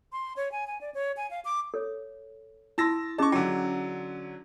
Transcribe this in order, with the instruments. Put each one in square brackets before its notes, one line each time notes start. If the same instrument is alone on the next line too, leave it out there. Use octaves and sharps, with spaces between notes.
[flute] C6
C#5
G#5
G#5
D5
C#5
G#5
F5
D6
[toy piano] A4 C#5
[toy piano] E4 C6 [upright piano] A5 E6 A#6
[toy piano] C#4 G#4 D#5 [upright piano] A5 C#6
[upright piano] D3 F#3 [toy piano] G5